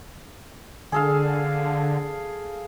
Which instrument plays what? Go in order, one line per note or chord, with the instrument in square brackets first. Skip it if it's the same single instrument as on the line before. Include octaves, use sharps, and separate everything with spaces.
[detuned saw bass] D3 [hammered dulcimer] G#4 A4 F5